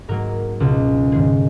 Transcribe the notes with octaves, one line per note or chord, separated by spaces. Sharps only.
G#2 F#3 A#3 A#4
C#2 B2 G#3
G#2 D#3 G#3 G#4